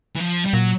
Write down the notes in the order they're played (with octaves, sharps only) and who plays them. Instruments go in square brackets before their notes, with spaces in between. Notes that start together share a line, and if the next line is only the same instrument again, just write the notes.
[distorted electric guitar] E3
F3
G3
[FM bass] A#2 [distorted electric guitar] F#3